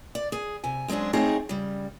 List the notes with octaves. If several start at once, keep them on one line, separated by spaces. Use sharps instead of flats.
D5
G#4
C3 G#5
F#2 G#3 C4 D4 G#4
A3 C4 D#4 G#4 C#5
C#3 G3